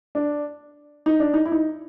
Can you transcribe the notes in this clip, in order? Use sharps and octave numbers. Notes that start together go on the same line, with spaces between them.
D4
D#4
D4
D#4
E4
D#4